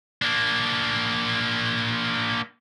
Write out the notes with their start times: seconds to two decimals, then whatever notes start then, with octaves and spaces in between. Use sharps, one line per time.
0.22 A#3 D4